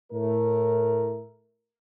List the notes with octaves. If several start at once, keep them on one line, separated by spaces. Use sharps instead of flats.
A2 A3 A#4